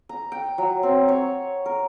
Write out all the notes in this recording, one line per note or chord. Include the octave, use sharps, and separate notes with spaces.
A#5
G5
F#3
C4
C#5
A#4